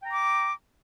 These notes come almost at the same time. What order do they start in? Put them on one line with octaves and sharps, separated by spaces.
G5 A#5 D6